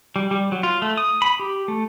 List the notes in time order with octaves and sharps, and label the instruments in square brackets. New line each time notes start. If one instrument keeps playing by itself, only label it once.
[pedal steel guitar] G3
G3
F#3
F4
A3
D#6
B5
G4
A3